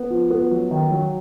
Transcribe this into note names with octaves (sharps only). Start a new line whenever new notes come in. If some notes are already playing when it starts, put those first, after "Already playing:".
Already playing: B3
F3
B3
F#3
D#3
F#3